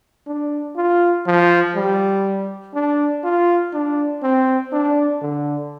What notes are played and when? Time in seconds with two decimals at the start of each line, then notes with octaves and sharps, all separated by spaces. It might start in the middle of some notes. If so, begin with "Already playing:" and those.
0.27 D4
0.76 F4
1.26 F3
1.75 G3
2.74 D4
3.24 F4
3.73 D4
4.23 C4
4.73 D4
5.21 D3